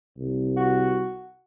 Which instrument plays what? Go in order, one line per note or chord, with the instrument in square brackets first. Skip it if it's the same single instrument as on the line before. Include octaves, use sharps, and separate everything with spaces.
[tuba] C2
[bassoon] F#4